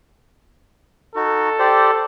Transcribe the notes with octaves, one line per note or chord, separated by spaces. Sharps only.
D#4 F#4 A4
G4 C5 D5